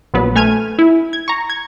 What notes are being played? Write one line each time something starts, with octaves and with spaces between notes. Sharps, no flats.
A#1 F#3 B3 B4
A3 G#5 F6 G#6 D#7
E4
G#6
A#5 C#6
G#6